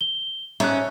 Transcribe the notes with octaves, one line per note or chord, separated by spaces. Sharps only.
G7
G#2 A3 C#4 C#5 E5 F#6